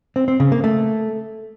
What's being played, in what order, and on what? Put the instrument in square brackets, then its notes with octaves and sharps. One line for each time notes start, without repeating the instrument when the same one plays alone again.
[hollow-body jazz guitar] C4
C4
C#3
A#3
A3